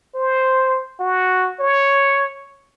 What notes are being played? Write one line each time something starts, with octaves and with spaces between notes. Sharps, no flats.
C5
F#4
C#5